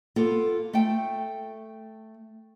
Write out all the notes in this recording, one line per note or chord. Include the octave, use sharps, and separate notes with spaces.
A#3 B3 F4 A4
A3 G5